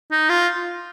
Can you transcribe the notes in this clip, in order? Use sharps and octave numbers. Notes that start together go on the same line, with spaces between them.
D#4
F4